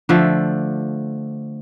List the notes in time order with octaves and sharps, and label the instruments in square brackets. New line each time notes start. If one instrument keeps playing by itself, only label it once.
[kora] D3 F3 A3